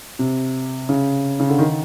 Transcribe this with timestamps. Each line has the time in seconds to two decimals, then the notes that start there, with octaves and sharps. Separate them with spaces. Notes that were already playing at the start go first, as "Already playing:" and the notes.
0.19 C3
0.89 C#3
1.40 C#3
1.49 D3
1.59 D#3